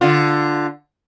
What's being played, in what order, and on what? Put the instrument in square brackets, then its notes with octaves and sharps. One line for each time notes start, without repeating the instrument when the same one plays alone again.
[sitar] D3 F4